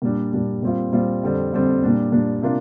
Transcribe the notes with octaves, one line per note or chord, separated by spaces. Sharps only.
A#2 G3 D4
A#2 G3 D4
A#2 G3 C4 F4
A#2 G3 C4 F4
F2 D3 G3 C4
F2 D3 G3 C4
A#2 G3 D4
A#2 G3 D4
C3 A#3 D4 F4